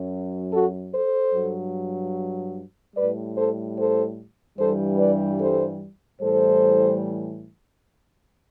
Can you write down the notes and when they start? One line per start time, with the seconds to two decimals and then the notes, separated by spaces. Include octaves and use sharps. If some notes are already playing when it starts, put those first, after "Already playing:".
Already playing: F#2 F#3
0.51 F#4 A4
0.92 A4 C5
1.33 G2 F#3
2.95 A2 G3 B4 D5
3.36 A4 C5
3.77 A4 C5
4.57 G2 E3 G3 A4 C5
4.98 B4 D5
5.39 A4 C5
6.20 A2 E3 G3 A4 C5